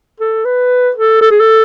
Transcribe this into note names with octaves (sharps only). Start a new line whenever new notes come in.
A4
B4
A4
A4
G#4
A4